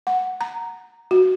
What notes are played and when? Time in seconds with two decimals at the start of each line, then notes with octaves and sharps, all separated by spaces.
0.07 F#5
0.41 A#5
1.11 F#4